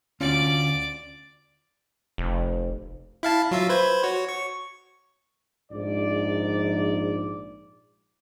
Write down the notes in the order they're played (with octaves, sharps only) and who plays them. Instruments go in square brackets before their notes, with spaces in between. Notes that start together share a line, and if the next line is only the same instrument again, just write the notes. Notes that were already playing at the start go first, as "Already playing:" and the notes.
[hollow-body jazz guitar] D2 C#4 F4 [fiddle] D5 D6
[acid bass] F1
[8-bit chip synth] E4 F5 A5
F#3 F4 E5
B4 C5 G#6
F#4 C#5
C#6
[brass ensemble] A#1 G#2 D5